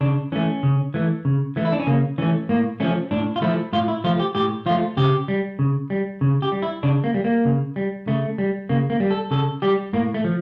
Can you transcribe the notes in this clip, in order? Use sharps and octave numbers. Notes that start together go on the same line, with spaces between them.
C#3 D4
E3 A3 C#4
C#3
E3 A3
C#3
E3 A3
E4
D4
C#4
C#3 A#3
E3 A3 C#4
A2 A#3
F3 A3 C#4
A2 D4
F4
F3 A3 E4
A2 F4
E4
F3 A3 F4
G4
A2 G4
F3 A3 F4
C#3 G4
G3
C#3
G3
C#3
G4
G3
E4
C#3 D4
A#3
G3
A#3
C#3
G3
C#3 A3
G3
C#3 A#3
A#3
G3
A4
C#3 A4
G3 G4
A2 A#3
A3
F3